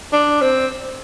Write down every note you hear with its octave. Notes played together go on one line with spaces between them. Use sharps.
D4
C4